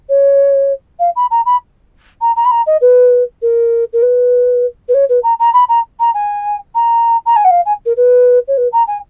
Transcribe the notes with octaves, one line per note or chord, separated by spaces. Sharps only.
C#5
F5
B5
A#5
B5
A#5
A#5
B5
A#5
D#5
B4
A#4
A#4
B4
B4
C#5
B4
A#5
A#5
B5
A#5
A#5
G#5
A#5
A#5
G#5
F#5
F5
G#5
A#4
B4
C#5
B4
A#5
G#5